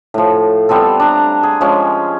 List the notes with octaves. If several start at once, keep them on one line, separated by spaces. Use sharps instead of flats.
A2 F3
G3 B3 C4 A4
D4 A#5
G#4
F3 G#3 C#4